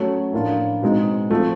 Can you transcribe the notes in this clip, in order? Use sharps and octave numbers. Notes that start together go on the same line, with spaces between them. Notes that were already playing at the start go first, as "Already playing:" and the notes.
Already playing: F#3 A3 C#4
A2 F3 A#3 D4 F4
B2 G#3 C4 D#4
F3 A3 C4